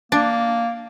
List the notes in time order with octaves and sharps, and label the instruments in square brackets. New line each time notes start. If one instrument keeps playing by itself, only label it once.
[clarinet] A#3 [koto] D4